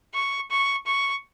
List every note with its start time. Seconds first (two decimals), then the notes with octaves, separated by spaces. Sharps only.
0.14 C#6
0.51 C#6
0.87 C#6